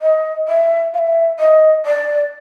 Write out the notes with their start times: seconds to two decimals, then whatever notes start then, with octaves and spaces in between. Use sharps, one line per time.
0.02 D#5
0.48 E5
0.94 F5
0.99 E5
1.39 D#5
1.86 D5